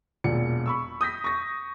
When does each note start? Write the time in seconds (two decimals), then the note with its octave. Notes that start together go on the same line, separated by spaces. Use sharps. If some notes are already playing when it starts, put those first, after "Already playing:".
0.24 E1 A#2 D5 C#7
0.66 B5 C#6 E6
1.01 D#6 G6 A#6 B6
1.24 C#6 A#6